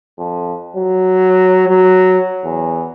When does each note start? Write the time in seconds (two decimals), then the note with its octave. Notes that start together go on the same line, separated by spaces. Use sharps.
0.18 F2
0.77 F#3
1.69 F#3
2.44 E2